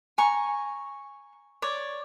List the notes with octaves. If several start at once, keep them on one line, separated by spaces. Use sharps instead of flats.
G#5 A#5 C#6
C#5 D5